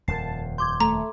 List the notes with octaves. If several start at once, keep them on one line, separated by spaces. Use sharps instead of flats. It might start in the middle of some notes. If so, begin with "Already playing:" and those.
D#1 F2 A#4 A5 C7
C6 D6 G6 G#6
A3 A#5